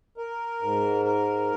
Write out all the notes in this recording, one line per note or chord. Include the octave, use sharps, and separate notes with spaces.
A#4
G#2
A#4